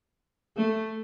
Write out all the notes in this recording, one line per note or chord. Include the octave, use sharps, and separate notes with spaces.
A3